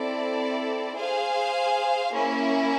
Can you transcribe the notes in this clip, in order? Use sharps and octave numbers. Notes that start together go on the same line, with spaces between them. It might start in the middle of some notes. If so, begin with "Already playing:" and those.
Already playing: C4 E4 A4 D5
G#4 C5 F5 G#5
A#3 C#4 E4